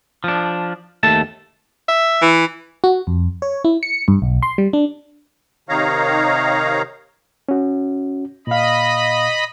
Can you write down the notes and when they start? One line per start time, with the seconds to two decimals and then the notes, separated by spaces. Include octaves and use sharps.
0.24 F3 D4
1.03 D#2 A3 A5
1.88 E5
2.22 E3
2.84 F#4
3.07 F2
3.42 C#5
3.65 E4
3.83 C#7
4.08 G2
4.22 B1
4.43 C6
4.58 G3
4.73 D4
5.69 C3 D#3 D#4 C#5 F5 A#5
7.49 C#4 F#4
8.47 A#2 D#5 F5 B5